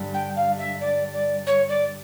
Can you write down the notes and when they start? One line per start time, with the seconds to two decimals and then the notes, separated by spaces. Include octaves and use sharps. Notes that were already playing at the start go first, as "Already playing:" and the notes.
Already playing: G2 D3 G3
0.13 G5
0.35 F5
0.58 E5
0.80 D5
1.13 D5
1.46 C#5
1.68 D5